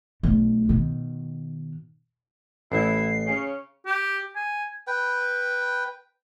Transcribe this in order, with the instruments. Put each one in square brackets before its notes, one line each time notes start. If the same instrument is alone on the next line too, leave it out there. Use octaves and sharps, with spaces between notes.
[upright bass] B1 A3
B2 D#3
[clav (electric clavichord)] A1 [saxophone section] E4 [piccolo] C7
[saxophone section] C#3 C#4
[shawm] G4
G#5
[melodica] B4 G5